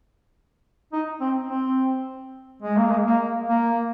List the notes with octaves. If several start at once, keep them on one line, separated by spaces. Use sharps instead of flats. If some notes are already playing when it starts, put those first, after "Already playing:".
D#4
C4
C4
G#3
A#3
G#3
A#3
A#3